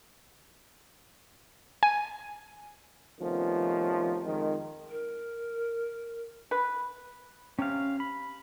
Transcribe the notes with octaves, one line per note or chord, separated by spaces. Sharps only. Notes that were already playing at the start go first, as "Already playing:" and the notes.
G#5
C3 D#3 F3 A3 B3 C#4
F2 D#3 G#3
A#4
B4
C3 C#4 F5
B5